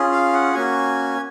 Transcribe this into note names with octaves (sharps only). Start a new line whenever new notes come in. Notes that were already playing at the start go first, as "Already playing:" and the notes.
Already playing: C#4 F4 G#4
F5
F#5
A#3 C#4 F#4 G#5